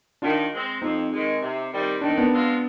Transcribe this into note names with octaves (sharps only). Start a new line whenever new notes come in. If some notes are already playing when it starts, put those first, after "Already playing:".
D#3 D4 F4
G#3 C4
F2 C4 D#4
D#3 G#3
C3
D#3 G3 C4
D#3 D4
C4
B3 D4
G#3 C4 F4